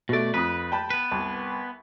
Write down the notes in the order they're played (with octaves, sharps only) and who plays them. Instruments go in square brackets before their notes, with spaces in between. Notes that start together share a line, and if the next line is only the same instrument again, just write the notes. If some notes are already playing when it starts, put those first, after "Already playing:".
[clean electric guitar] B2 D5 [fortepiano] A3 F#4
[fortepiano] F2 D#6 [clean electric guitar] B4
[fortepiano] G5 A5 B5
[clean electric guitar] B3 B4
[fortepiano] C2 A5